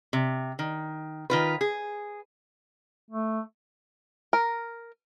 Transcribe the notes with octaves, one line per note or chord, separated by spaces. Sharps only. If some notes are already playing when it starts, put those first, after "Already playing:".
C3
D#3
D#3 F4 B4
G#4
A3
A#4